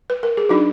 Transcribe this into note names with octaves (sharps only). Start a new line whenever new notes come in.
B4
A#4
G#4
F#3 D4 D#4 F#4